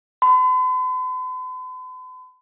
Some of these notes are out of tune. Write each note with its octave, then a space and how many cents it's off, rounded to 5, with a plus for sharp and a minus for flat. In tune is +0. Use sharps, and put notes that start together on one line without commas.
B5 +45